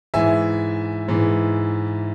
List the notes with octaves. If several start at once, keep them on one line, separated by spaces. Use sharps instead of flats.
G#2 E3 E5 G#5
G#2 E3